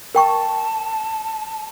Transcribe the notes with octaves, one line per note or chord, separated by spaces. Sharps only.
A#4 G5 A5 C#6